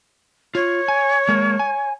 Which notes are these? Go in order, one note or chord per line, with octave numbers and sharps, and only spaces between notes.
F4 C#5
G#5
G#3 A#3 A#4
G#5